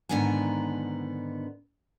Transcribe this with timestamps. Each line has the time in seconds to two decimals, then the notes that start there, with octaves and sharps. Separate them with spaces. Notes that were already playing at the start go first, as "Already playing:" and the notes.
0.09 G#2 D3 D#3 B3 D4 G#5